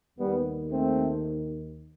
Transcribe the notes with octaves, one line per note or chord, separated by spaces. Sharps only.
D#2 D#3 G3 B3
A3 C4